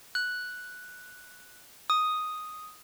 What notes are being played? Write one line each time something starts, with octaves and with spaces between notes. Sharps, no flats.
F#6
D#6